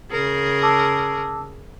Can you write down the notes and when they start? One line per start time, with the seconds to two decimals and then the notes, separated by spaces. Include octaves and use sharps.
0.11 C#3 G#4 A#4
0.62 A5 D6 E6